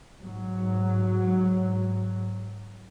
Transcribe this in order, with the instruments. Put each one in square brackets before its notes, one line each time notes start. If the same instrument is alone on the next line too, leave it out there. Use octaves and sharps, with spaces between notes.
[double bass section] G#2 F#3